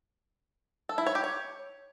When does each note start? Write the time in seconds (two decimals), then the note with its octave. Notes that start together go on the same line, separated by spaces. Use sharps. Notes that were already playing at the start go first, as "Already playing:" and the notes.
0.89 A4
0.98 E4
1.07 C#5
1.15 G4
1.24 C#5